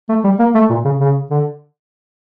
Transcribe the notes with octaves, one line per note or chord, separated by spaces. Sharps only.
A3
G3
A#3
A3
A#2
C#3
C#3
D3